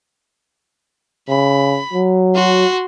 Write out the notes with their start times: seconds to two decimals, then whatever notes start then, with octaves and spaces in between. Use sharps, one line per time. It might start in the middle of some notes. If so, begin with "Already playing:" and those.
1.29 C#3 B5
1.93 F#3
2.35 F#4 C6